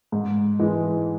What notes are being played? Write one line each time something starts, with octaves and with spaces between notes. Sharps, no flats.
G#2
E3 G#3